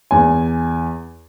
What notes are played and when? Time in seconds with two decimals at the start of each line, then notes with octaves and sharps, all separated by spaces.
0.11 E2 G#5